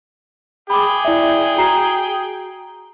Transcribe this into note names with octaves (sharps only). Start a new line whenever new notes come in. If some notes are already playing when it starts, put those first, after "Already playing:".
G#4 G5 B5 D6
E4 D5 E5
F#4 A#5 C7